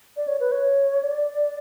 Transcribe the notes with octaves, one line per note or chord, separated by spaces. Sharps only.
D5
C#5
B4
C#5
D5